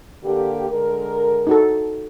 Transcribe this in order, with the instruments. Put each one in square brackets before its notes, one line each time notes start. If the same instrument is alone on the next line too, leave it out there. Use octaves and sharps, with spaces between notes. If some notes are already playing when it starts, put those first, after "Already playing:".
[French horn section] D3 A#3 G4
D3 G#3 A#4
[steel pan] D#4 F#4 A4